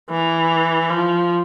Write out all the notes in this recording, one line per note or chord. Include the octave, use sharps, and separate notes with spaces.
E3
F3